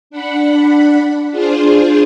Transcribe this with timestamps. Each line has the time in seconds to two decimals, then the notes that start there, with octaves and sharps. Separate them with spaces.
0.10 D4 F#5 B5
1.30 D4 F4 G#4 C5